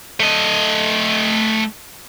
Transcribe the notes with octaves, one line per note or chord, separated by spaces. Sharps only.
A3 D#5